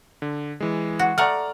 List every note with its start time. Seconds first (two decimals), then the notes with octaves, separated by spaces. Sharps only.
0.22 D3
0.60 E3 G#3
0.99 F#4
1.18 A3 D5 F#5 A#5 F6